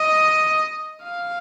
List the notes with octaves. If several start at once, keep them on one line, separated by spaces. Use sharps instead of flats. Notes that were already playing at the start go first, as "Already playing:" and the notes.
Already playing: D#5
F5